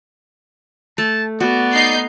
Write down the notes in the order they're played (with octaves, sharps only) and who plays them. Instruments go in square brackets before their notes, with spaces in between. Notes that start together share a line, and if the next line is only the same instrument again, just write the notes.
[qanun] A3 [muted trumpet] A5
[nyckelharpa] B3 [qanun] F#4 [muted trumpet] D5
[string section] D#4 G6 C7